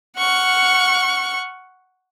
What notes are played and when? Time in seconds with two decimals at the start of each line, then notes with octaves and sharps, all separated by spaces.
0.18 F#5 C#6 F6